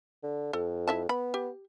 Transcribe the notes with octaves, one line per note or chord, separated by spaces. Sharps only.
D3
F2 A4
E4 E5 A5
B3 B5
G4